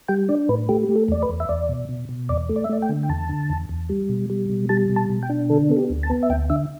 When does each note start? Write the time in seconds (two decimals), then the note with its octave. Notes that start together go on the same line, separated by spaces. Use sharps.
0.08 G3 G5
0.29 D4 D5
0.49 A2 B4
0.69 A3 G4
0.83 G4
0.89 A3
0.96 A4
1.08 E2 D5
1.23 B4
1.29 E2
1.40 E5
1.49 E2 D5
1.69 B2
1.89 B2
2.09 B2
2.29 E2 D5
2.49 A3
2.56 D5
2.64 E5
2.69 A3 D5
2.82 G5
2.89 D3
3.03 G5
3.09 E2 A5
3.29 D3
3.50 E2
3.69 E2
3.89 G3
4.09 B2
4.30 G3
4.50 B2
4.69 G3 A5
4.89 B2
4.96 A5
5.10 B2
5.23 G5
5.29 D4
5.50 D3 A4
5.69 B3 A4
5.77 G4
5.90 D2
6.03 A5
6.10 B3
6.23 E5
6.30 D2 G5
6.50 D3 E5